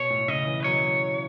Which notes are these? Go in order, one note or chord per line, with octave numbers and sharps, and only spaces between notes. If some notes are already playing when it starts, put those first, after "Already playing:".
Already playing: B2 C#5
A2
C#3 D#5
E3
B4
F#3 C#5